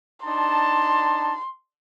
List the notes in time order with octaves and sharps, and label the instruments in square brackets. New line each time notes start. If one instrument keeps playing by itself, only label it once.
[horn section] D4 D#4 A5 [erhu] C6